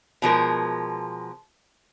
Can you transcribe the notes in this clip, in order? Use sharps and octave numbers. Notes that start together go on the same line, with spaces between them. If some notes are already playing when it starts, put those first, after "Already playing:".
B2 F3 G#3 A#4